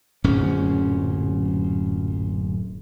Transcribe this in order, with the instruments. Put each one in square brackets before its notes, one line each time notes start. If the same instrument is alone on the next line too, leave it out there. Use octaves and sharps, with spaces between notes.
[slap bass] D1 F#2 A#2 C#4